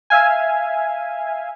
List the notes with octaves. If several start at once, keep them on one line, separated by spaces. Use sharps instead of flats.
E5 F5 G#5